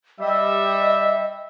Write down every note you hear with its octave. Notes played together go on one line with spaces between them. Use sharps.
G3 D#5 E5